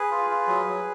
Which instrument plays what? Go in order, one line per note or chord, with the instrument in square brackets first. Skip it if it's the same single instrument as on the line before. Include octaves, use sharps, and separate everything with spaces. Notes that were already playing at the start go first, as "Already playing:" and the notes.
Already playing: [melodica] G#4 B4
F4
F4
F#3
F#3